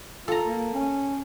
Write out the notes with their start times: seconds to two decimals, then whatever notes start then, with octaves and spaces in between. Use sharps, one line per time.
0.28 F4 A4 A#5
0.46 A#3
0.74 C#4